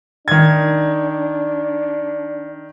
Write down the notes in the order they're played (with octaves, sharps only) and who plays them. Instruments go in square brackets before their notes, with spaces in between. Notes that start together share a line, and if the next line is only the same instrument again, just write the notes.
[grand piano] D#3 G#6 [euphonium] D4